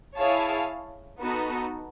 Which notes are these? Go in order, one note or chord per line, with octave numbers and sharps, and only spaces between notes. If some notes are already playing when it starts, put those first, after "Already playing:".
E4 G#4 C#5 F5 A5
B3 D#4 F#4 A4